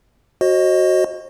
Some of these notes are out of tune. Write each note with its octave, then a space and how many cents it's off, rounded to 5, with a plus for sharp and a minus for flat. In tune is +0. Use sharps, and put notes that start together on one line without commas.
F#4 +0 C5 +40 D#5 +0